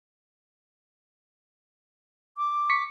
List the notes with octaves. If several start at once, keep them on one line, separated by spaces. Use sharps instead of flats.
D6
C#6 B6 C#7